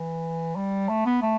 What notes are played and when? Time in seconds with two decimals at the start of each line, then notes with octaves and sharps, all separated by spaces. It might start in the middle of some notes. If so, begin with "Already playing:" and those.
Already playing: E3
0.56 G3
0.89 A3
1.06 B3
1.22 A3